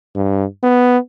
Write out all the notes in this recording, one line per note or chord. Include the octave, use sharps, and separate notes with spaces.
G2
B3